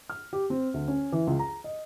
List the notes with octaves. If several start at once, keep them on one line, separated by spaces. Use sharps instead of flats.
F6
G4
C4
D2
C#4
E3
C#2
A#5
D#5